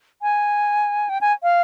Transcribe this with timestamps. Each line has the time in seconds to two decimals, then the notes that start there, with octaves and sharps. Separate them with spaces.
0.22 G#5
1.09 G5
1.21 G#5
1.43 F5